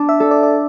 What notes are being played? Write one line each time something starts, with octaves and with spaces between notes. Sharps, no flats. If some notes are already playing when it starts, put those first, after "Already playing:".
Already playing: D4 D5
E5
A4
D5
D5